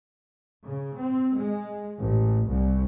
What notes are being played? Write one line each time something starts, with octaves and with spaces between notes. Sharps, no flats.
C#3
C4
G#3
A1
C2